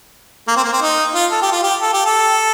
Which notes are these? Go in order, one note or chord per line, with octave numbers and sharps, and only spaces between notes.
A#3
C4
A#3
C4
D#4
F4
A4
G4
F4
G4
A4
G4
A4